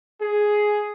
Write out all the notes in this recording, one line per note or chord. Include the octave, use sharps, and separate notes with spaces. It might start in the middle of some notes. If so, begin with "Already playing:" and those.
G#4